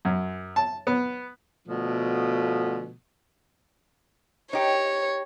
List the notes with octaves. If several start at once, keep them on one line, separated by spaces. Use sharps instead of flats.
F#2
A5
B3
B2 D3 F3 A3
D#4 G4 C#5